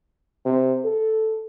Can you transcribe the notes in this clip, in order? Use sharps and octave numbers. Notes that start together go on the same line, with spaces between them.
C3
A4